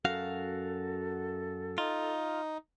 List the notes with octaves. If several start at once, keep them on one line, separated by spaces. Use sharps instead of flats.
F#2 F#4 A4 F5
D#4 F4